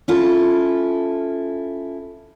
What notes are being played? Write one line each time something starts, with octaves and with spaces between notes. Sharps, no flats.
C#4 E4 F4 A4